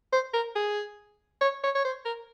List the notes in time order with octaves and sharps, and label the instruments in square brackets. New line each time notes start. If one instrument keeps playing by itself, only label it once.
[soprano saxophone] C5
A#4
G#4
C#5
C#5
C#5
C5
A#4